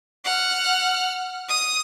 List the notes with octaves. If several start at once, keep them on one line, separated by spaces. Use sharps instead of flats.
F#5 F6
D#6